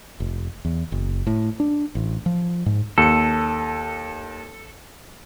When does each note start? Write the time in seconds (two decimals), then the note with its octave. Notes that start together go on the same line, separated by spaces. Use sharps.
0.20 F1
0.65 E2
0.92 F#1
1.27 A2
1.60 D4
1.95 A1
2.26 F3
2.66 G#2
2.98 D#2 A4 C#7